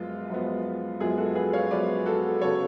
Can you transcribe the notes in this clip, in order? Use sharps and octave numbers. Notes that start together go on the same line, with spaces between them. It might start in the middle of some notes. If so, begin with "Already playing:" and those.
Already playing: F#2 F3 G#3 B3 F4
F#2 F3 G#3 B3
F#2 F3 G#3 B3 F4 G#4
F#4 A4
G#4 B4
C#5 F5
F#2 F3 G#3 B3 B4 D5
F#4 A4
C#3 F#3 B3 A4 C#5